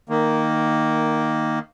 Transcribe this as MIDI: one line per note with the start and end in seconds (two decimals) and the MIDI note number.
0.09 1.59 51
0.09 1.59 58